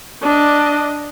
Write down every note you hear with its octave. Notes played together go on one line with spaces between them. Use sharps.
D4 D#5